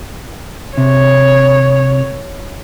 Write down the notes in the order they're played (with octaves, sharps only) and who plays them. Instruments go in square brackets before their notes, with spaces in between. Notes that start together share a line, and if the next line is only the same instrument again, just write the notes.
[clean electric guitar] C3 [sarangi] C#5